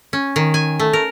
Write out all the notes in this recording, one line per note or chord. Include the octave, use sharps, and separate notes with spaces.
C#4
D#3
G#5
A3
A#4